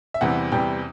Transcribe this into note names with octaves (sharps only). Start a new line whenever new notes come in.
E5
E2 C3 E3 G3 F#5
E2 C3 E3 G3 G5